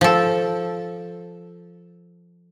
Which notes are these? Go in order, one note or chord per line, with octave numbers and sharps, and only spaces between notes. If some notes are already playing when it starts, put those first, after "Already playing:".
F3 A4